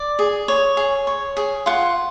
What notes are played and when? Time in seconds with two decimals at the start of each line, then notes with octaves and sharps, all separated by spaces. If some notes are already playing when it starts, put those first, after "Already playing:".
Already playing: D5
0.19 G#4
0.48 C#5
0.77 G#4
1.07 C#5
1.37 G#4
1.66 F4 F#5